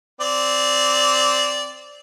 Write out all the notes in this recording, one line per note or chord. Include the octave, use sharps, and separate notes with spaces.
C4 D5